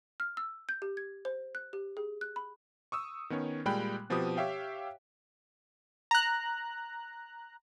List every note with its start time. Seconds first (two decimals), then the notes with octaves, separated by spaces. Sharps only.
0.20 F6
0.37 E6
0.69 G6
0.82 G4
0.97 G#6
1.25 C5
1.55 F#6
1.73 G4
1.97 G#4
2.21 F#6
2.36 B5
2.92 C#6 D#6 E6
3.30 D#3 B3 C#4 C#5
3.65 A#2 G3 G#3 G5 B5 F#6
4.10 B2 F3 C4 G4 B4 D#6
4.37 G4 C#5 E5 F5 G5
6.11 A#5 F#6